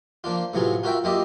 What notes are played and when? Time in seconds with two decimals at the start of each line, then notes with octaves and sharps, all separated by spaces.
0.24 F3 A#3 D4 F4
0.54 A2 C3 F#3 B3 F4 G#4
0.83 F4 F#4 A#4 E5 G5
1.04 F#2 A#3 F4 G4 D#5 E5